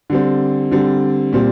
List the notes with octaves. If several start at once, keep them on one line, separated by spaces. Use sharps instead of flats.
D3 G3 C4
D3 G3 C4
A#2 G3 C4